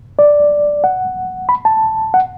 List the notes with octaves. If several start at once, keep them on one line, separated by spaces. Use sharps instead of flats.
D5
F#5
B5
A5
F#5